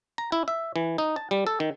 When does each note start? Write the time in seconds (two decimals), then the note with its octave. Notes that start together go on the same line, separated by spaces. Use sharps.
0.18 A#5
0.32 E4
0.48 E5
0.76 E3
0.98 D#4
1.16 A5
1.31 G3
1.47 A4
1.60 D#3